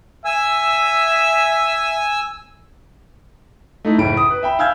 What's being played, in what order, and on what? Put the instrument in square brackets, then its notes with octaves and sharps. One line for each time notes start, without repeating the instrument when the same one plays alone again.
[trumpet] E5 [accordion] G#5 E6
[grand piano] A3 D#4 E4
F#1 A2 B5 D7
D#6
B4
E5 G5 B5
F5 G#5 E6 F6 G6 G#6